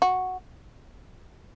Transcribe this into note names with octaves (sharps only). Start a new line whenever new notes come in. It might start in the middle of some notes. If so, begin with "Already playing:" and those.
F#4